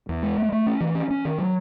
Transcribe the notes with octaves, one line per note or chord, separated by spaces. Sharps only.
E2
G#3
A3
A3
C#4
E3
C#4
C#4
D#3
F#3